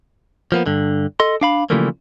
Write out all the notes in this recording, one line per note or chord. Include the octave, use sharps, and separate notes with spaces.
F3 A#3 B3
G2 D3
A4 D#5 C6
D4 F5 B5
C#3 E3 F3 G3 A3 A#3